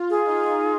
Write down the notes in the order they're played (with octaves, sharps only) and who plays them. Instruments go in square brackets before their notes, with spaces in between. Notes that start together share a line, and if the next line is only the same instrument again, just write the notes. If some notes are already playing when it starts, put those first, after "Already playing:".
Already playing: [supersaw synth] F4
[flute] G#4
[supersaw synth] D#4